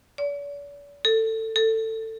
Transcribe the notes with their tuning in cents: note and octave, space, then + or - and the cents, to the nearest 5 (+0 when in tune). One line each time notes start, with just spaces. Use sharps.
D5 -45
A4 +20
A4 +20